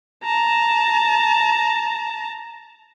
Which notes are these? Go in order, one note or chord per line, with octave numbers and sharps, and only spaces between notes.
A5 A#5